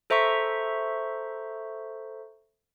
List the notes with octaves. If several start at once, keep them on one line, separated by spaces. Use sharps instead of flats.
A4 C5 E5 A#5 C#6